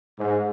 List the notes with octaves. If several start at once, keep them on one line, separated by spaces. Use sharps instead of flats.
G#2